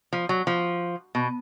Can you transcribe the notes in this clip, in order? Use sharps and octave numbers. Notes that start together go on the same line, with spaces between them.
F3
F#3
F3
B2